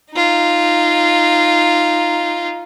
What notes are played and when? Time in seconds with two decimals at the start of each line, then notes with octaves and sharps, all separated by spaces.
0.12 D#4 F4